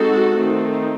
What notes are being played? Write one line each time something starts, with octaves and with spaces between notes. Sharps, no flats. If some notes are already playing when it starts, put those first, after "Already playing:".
Already playing: G#3 C4 D#4 F#4 A4
D#3 A3 C4 D#4